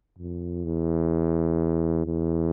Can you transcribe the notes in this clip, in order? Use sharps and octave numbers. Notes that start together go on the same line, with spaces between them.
F2
E2
E2